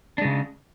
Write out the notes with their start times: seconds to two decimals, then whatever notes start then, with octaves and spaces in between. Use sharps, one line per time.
0.18 D4
0.21 G#3
0.25 C#3